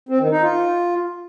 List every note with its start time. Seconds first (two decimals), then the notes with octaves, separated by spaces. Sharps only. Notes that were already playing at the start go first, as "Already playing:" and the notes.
0.09 C4
0.20 D#3
0.31 D#4
0.42 F4